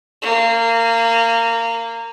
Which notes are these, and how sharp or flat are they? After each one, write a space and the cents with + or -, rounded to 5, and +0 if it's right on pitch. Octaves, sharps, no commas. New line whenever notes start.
A#3 -20